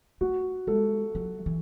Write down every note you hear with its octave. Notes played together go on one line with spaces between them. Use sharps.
A3 F#4
G#3 A4
F#3
E3